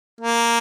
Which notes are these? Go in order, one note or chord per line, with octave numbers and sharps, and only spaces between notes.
A#3